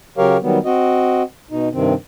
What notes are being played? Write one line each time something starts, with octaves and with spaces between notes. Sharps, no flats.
C#3 F#3 G4 A#4 C#5 F5
D#3 F#3 G3 B3
C4 F#4 D#5
B2 D#4
G2 C3 D#3 C4